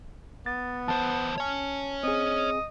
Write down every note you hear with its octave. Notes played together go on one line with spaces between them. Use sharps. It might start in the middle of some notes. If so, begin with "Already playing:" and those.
B3 A6
E2 C5 A5
C#5 G#5
C4 G#4 D#5